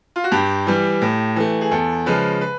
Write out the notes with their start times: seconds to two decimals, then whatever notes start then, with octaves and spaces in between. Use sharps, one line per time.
0.16 F4
0.24 F#4
0.32 G2 G4
0.67 E3 G3
1.01 A2
1.36 E3 A3
1.61 G#4
1.71 E2 A4
2.06 C#3 F3 G#3 B4
2.41 B4